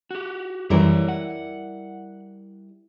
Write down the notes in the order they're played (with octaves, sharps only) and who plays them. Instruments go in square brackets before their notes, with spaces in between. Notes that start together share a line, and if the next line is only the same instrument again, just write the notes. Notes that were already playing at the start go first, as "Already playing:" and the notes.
[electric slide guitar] F#4 G4
[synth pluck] F#2 E3 [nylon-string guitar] G3 E4 A#4 [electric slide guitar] G4 C#5
[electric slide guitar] F#5